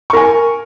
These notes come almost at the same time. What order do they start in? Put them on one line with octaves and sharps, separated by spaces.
C#6 A#4 G#5